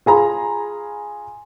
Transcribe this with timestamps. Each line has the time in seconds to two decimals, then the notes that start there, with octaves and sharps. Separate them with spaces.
0.06 F4 G#4 A#5 B5